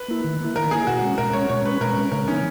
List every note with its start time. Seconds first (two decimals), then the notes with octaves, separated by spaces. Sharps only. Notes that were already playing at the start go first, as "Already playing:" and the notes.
Already playing: B4
0.08 A#3 E4
0.24 D#3
0.40 A#3 E4
0.55 D#3 A#4
0.71 A#3 E4 G#4
0.87 B2 F#4
1.02 G#3 C#4
1.18 B2 A#4
1.33 G#3 C#4 C#5
1.50 B2 C#5
1.65 G#3 C#4 B4
1.81 B2 A#4
1.97 G#3 C#4
2.12 C#3 A#4
2.28 E3 B3 C#4 D#4